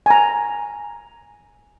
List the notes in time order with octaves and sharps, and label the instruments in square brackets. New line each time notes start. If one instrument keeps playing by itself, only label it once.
[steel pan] G#5 A#5